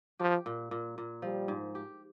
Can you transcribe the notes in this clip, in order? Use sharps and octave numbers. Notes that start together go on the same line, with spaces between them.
F3 G4
A#2
A#2
A#2
F3 G3
G#2
G4